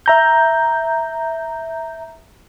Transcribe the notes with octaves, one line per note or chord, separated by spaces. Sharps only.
E5 A#5 G6